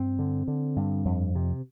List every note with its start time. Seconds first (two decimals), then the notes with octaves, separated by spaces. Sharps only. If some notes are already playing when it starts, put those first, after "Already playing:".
Already playing: G2 C4
0.19 D3
0.48 D3
0.76 G2
1.05 F2
1.35 C3